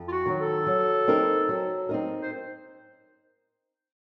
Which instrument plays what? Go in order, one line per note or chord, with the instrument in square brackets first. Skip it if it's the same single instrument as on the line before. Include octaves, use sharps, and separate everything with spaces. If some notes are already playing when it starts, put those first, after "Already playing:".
Already playing: [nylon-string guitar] F2
[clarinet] F4
F#4
[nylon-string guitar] D#3 F#3
[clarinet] A4
[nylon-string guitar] F#3
C4 D#4 A#4
F#3
C4 D#4 A#4
[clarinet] C5